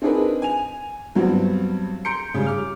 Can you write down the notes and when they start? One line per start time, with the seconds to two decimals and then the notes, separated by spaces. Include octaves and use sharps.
0.02 C4 D4 D#4 G#4 A#4 B4
0.42 G#5 F7
1.15 G2 F#3 G3 B3 C4
2.05 A#5 C6 G6 C#7 D7
2.34 C#3 G3
2.46 D6 F6